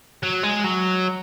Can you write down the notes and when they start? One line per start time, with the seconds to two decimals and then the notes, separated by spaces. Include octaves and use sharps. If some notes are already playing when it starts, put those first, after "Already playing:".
0.23 F#3
0.43 G#3
0.64 F#3